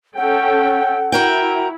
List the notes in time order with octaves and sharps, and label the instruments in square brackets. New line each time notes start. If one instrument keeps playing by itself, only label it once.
[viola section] C#4 A4 G5 [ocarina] F#5
[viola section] E4 [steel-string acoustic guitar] F#4 A#4 G5